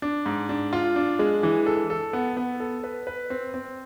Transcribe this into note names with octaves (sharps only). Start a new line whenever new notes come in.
D4
G#2
D4
F4
D4
G#3
E3
A4
A4
B3
B3
A4
B4
B4
C4
C4